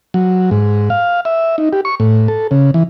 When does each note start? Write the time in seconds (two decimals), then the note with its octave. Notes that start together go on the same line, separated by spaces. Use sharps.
0.14 F#3
0.51 G#2
0.90 F5
1.25 E5
1.58 D#4
1.73 G4
1.85 C#6
2.00 A2
2.28 A4
2.51 C#3
2.74 E3